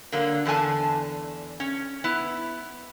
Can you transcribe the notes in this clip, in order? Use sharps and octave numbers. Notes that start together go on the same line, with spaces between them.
D3 F#3 A#3
E2 D3 A4 G#5 A5
C#4
B3 E4